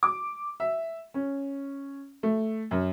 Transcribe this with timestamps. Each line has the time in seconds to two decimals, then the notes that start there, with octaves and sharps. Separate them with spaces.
0.03 D6
0.60 E5
1.14 C#4
2.23 A3
2.71 F#2